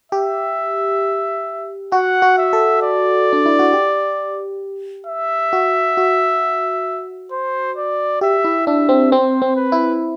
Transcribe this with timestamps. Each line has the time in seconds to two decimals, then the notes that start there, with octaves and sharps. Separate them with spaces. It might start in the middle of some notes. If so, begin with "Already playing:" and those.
0.12 G4 E5
1.92 F#4 F#5
2.22 F#4
2.38 E5
2.53 A4
2.82 D5
3.33 D4
3.46 E4
3.59 F#4
3.73 G4
5.07 E5
5.53 F#4
5.97 F#4
7.31 C5
7.77 D5
8.21 G4 E5
8.44 E4
8.67 D4 E5
8.89 C4
9.12 C4 C5
9.42 C4
9.56 B4
9.72 E4